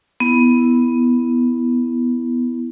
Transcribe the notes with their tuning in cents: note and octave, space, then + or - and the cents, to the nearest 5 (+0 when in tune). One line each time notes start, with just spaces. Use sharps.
B3 +0 E4 +0